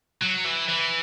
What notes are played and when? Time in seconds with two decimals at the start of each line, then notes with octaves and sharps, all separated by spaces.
0.22 F#3
0.45 E3
0.68 E3